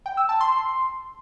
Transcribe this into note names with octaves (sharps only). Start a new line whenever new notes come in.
G5
E6
A5
C6